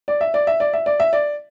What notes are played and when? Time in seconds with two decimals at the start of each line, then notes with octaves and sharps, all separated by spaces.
0.08 D5
0.21 E5
0.34 D5
0.47 E5
0.60 D5
0.73 E5
0.86 D5
1.00 E5
1.13 D5